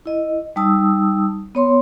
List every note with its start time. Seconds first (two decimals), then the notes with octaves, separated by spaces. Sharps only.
0.06 E4 D#5
0.56 G3 D#4 A5 D#6 E6
1.55 B3 C#5 C6